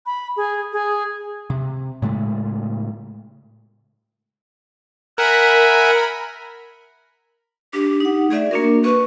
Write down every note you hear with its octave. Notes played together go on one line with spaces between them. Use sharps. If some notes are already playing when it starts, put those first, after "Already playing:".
B5
G#4
G#4
C3
A2 C#3 G#3 A3
A#4 E5 F#5 G#5 B5
D4 G4
D#4 F#5
A3 G#4 D5 E5
A#3 D4 F#4 A#4
B4 C#6